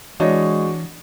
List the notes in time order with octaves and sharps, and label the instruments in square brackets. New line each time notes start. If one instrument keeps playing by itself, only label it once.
[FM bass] E3 [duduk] G#3 [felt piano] D4 C#5 D#5 [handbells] F#4